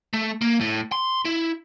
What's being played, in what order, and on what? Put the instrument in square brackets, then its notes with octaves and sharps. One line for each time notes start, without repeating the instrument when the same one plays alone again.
[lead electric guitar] A3
A#3
A2
C6
E4